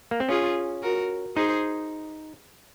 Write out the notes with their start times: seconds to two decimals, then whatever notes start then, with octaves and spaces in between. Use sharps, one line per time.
0.11 A#3
0.20 C4
0.29 C#4 F4 G#4
0.82 F#4 A#4
1.36 D#4 G#4 C5